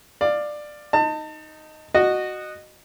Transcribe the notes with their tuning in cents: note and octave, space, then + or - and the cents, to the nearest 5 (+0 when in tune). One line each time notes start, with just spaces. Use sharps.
D5 +15 F5 +0
D#4 +0 A5 +35
F#4 +0 D#5 -20